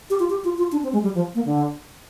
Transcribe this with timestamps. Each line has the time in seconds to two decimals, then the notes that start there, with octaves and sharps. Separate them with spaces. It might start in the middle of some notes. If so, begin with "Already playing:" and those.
0.10 G4
0.20 F4
0.30 G4
0.44 F4
0.58 F4
0.72 D4
0.83 C4
0.93 G#3
1.03 G3
1.15 F3
1.35 A#3
1.45 D3